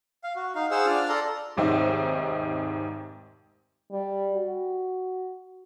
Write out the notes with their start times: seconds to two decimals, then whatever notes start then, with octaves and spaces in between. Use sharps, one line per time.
0.24 F5
0.36 F#4
0.55 D#4 F5
0.71 G#4 C5 F5 F#5 E6
0.86 D4 F4 D5 F6
1.09 A4 D5 A#5 C6
1.57 F1 D#2 G#2 C4 D#4 E5
3.92 G3
4.35 F#4